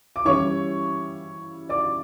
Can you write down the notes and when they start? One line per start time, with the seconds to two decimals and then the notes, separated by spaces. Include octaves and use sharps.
0.16 D6
0.25 E3 G3 C#4 E4 C#5 C#6
1.69 D5 D6